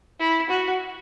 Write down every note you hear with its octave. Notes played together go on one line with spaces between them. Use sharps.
E4
F#4